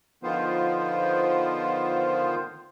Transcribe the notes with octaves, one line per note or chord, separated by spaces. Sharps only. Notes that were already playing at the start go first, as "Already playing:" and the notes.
D3 D#3 F3 B3 F4 C5